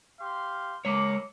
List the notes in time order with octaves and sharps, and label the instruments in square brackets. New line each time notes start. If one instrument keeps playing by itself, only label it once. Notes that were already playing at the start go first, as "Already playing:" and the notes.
[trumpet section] G4 F5 C6
[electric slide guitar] G#3 C#5 [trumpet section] A#3 D6